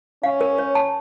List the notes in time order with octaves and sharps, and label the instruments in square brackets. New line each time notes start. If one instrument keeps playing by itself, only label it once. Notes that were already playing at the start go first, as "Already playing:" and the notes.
[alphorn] C#4 [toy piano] F5
[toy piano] A#4
C#5
A5